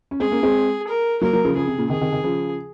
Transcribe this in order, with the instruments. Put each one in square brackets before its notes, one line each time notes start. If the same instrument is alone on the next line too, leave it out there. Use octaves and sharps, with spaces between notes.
[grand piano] C#4
[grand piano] G#3 C4 [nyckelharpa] G#4
[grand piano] A#3 C#4
G#3 C4
[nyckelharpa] A#4
[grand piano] F#3 A#3 [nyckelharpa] A#4
[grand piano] F#3 A#3
C#3 F3
[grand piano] C#3 F3 [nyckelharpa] G#4
[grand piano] C3
A#2 C#3
[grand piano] C3 D#3 [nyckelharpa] G#4
[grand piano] C3 D#3
C3 D#3
C#3 F3